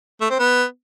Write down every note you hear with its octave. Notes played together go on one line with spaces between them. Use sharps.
A3
C4
B3